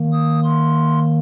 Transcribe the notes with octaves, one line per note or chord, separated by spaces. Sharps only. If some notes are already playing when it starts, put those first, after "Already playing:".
Already playing: D#3 A#3
D#6
C6